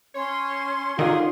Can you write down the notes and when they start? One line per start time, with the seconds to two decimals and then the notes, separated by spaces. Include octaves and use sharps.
0.14 C#4 C#5 C6
0.99 D3 D#3 F3 F4 G#4